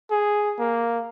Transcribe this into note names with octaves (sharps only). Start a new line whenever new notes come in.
G#4
A#3